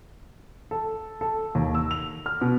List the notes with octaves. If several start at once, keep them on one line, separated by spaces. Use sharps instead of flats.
A4
A4
D#2
E6
F7
F6
B2